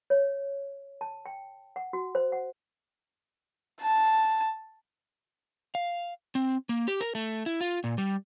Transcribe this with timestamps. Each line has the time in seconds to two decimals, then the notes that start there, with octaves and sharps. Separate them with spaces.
0.10 C#5
1.01 A5
1.26 G5
1.76 F#5
1.93 F#4
2.15 C5
2.32 F#5
3.82 A5
5.75 F5
6.35 C4
6.69 A#3
6.88 G4
7.01 A#4
7.15 A3
7.46 E4
7.61 F4
7.84 A#2
7.98 G3